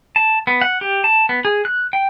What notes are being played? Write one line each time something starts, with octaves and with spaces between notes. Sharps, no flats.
A5
B3
F#5
G4
A5
B3
G#4
F#6
G5